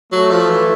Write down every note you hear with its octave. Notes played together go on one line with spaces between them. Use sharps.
F#3 A3
F3
E3